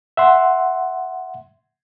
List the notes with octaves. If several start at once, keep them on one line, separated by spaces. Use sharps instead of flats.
E5 F#5 C6